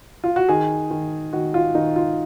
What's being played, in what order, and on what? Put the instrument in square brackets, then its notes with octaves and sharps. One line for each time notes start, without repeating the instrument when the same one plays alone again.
[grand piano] F4
F#4
D#3 G#4
D#3
D#3 F#4
F4
D#3 D#4
F4